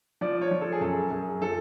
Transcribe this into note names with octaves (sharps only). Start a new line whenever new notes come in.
F3 D5
C#5
F3
A4
G#4
F#2 A4
F#2 G#4
F3 A4